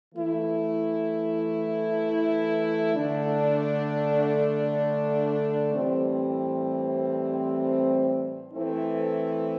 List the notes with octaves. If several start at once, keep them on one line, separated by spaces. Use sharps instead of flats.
E3 A3 E4
D3 A3 D4
A2 E3 G3 C4
E3 A3 C4 E4